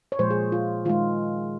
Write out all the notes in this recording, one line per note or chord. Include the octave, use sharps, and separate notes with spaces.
C#5
A#2 F3 G#3 C5
G#4
F4
D#3 G#3 F4